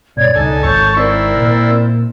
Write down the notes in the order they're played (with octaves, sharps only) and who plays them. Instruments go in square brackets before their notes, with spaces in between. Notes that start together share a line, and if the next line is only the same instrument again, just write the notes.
[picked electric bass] G2 B2 [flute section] C#5 D5 G#6
[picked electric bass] C#2 [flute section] D4 D#4 [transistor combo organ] A4 G#5
[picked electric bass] G#1 G#2 D#3 [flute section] A4 C#6 G6 [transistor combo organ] C#5 A5
[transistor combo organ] C4 E4 [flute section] A#4 D5
[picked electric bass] A#2